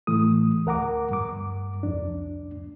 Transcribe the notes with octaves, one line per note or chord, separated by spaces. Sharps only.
A2 E3 A3 D#6
D2 A#4 F#5 A#5 D6
G2 D6
C2 F2 D4